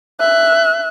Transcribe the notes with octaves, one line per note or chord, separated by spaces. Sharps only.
E5 F#6